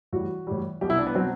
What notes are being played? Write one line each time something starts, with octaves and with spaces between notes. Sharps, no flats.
A2 E3 G3 F#4
A2 E3 G3
C2 B2 F#3 G4
E4
D4
B3
B2 F#3 C4